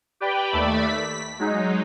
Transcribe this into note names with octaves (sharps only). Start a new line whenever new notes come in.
G4 B4 D5 G5
D#2 A3 D5 E5 B5
B6
F#3 G#3 D#4